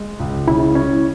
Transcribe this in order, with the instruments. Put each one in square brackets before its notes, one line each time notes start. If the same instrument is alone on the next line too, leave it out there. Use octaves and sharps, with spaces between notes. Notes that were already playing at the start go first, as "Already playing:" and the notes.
Already playing: [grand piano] G#3
C#2
[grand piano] C#3 [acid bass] E4
[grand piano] C#4